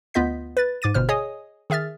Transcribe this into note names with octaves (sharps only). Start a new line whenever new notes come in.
D2 B3 F4 D#5 G6 B6
B4 A6
G#2 D6 A6 D#7
G1 B2 C5 F6
G#4 C#5 D#5 G#5 D#6
D#3 G#4 E5 F6 A6